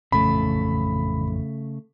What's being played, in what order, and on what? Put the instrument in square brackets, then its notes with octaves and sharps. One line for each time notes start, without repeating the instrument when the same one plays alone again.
[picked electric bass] A1 F2 E3 [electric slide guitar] C#3 A3 [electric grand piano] B5